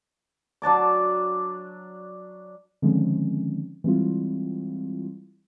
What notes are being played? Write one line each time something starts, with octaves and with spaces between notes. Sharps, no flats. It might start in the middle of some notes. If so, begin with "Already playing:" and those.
F#3 D4 A5 D6
D3 D#3 F3 G#3 C4 C#4
E3 G3 G#3 C4 E4 F4